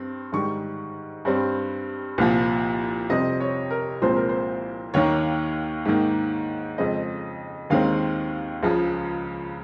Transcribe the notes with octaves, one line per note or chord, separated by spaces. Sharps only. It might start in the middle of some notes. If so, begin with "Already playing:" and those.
Already playing: G2 C4
G#2 D#3 G3 C#6
G2 G3 C4
C2 A#2 F3
F2 C3 G3 C4 D#5
C#5
A#4
C2 A#2 F3 G#3 C4 C5
A#4
C5
D#2 D#3 A#3 C#5
G#2 D#3 A#3
F2 C#3 G#3 C4 D#5
D#2 D#3 G#3 C4 F5
C#2 C#3 F3